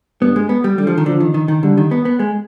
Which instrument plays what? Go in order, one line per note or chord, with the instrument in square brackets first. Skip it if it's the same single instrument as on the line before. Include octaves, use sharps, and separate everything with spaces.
[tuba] G2 [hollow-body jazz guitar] B3
[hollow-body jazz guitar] G#3
B3
G3
[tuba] D3 [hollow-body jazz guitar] G3
[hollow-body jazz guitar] F3
D#3
[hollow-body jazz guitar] D3 [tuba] F3
[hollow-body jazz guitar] D#3
D#3
D#3
[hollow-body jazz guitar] D3 [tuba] G3
[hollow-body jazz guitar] D#3
B3
B3
G#3